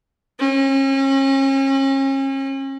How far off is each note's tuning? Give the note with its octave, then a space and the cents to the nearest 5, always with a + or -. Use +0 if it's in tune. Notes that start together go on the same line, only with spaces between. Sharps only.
C#4 -40